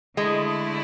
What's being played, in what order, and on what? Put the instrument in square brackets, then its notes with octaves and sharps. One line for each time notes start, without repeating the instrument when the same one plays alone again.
[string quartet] D3 A3 E4 [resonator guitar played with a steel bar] G#3